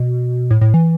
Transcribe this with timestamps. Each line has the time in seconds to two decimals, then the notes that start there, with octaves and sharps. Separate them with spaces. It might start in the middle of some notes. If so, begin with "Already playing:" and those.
Already playing: B2
0.51 A2
0.61 A2
0.74 E3